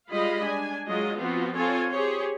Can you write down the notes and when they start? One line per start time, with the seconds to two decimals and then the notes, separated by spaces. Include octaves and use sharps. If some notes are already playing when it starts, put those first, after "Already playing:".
0.10 G3 G#3 F4 D#5 F5 B5
0.43 D4 G#5
0.88 F#3 G#3 F4 D#5
1.21 F3 B3 C4 F4 F#4
1.55 C4 F4 A4 C#5 G#5
1.91 G4 G#4 C5 C#5